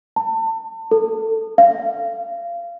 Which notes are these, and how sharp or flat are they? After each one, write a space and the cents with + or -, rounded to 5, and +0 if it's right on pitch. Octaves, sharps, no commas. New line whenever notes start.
A5 +30
A4 +15
F5 -25